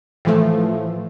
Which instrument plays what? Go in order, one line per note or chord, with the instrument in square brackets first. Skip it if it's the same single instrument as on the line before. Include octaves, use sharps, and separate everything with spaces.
[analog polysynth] A2 E3 F3 A3